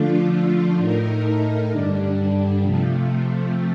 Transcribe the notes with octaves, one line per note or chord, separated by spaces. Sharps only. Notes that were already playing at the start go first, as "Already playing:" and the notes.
Already playing: D3 F3 A3 D4 F4
A2 A3 D#4 A#4
G2 D3 G3 D4
C3 F3 A3